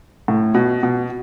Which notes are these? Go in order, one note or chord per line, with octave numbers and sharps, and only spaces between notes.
A2
B2
B2